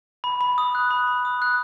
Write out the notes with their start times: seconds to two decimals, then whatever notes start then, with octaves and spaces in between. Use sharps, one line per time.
0.24 B5
0.41 B5
0.58 D#6
0.75 F#6
0.91 B5
1.07 B5
1.25 D#6
1.42 F#6